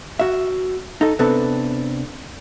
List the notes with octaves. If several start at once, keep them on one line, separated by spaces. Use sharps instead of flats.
F#4 E5
D#4 A4
C3 B3 C4 D4 A4 B4